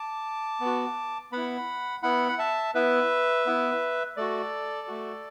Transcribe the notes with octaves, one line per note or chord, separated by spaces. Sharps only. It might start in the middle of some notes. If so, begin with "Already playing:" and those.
Already playing: A5 D6
B3
F#4
B3 E4 F#5 B5
B3 E4 F#5 B5
F#5
E5 A5
B3 E4 B4 E5
B3 E4
A3 F#4 A4 D5
A3 F#4